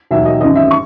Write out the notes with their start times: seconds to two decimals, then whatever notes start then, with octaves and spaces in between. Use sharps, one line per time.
0.11 E1 D#2 D#3 F#3 E5
0.25 D#5
0.41 G#1 F#2 E3 D#5
0.56 E5
0.71 C#6